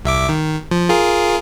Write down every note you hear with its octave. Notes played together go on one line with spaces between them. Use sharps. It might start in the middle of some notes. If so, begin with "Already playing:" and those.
C2 E5 D6
D#3
F3
F4 G#4 A#4